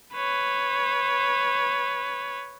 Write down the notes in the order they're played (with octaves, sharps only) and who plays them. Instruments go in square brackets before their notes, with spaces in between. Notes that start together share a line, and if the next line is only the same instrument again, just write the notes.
[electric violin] B4 C#5